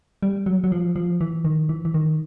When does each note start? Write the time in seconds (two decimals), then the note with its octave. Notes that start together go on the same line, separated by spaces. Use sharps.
0.23 G3
0.46 F#3
0.64 F#3
0.72 F3
0.96 F3
1.21 E3
1.45 D#3
1.69 E3
1.85 E3
1.94 D#3